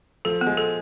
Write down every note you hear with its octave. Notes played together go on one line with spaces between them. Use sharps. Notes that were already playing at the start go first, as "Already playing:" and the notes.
F3 A4
B3
G#3
A4